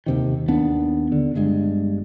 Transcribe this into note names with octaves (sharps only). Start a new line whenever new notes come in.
D#2 C3 D#3
D#2 B3 D4
D3
G1 G2 G#3